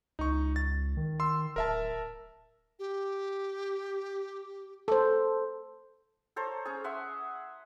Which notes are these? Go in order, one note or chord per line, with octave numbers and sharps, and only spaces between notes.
C#2 D#4 C#6
A6
D#3
C6 E6
D1 A#4 E5 A5
G4
A4 C5
A4 C5 C#5 A#5
C#4 G#4
E5 F#5 C6